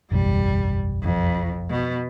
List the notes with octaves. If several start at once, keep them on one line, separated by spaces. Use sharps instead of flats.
F#1 B1 E2 G3
F2
B2